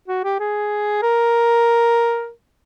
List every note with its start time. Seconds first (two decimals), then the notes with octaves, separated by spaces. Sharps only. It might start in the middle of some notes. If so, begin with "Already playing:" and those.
0.08 F#4
0.24 G4
0.40 G#4
1.02 A#4